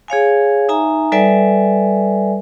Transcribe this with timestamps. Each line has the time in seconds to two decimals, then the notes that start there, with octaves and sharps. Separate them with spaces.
0.08 G#4 C#5 F5 G#5
0.69 D#4 E5 G#5 A#5
1.12 G3 A4 B4 D5 E5 G#5